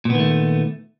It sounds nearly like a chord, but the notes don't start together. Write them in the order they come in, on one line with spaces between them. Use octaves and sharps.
A#2 B3 D#3 A3